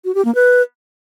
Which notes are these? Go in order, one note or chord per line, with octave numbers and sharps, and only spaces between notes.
F#4
G4
A#3
B4